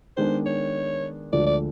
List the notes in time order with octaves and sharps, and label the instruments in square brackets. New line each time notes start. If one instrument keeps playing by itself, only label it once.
[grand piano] D#3 G#3 B3 D4 [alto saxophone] C5
[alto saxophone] C#5
[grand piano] D2 D3 F3 G#3 [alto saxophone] D5
[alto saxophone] D5